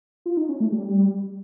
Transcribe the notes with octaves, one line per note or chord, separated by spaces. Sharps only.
F4
D#4
C#4
A3
G3